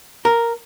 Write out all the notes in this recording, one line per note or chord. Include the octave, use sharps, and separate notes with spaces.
A#4